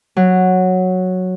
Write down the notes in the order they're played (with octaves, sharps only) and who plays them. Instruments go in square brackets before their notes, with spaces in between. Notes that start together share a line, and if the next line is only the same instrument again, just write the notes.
[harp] F#3